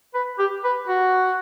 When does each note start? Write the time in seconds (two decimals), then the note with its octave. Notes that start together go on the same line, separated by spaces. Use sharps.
0.14 B4
0.39 G4
0.64 B4
0.88 F#4